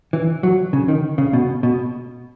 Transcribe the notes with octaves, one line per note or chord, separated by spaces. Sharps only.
E3
F#3
C#3
D#3
C#3
B2
B2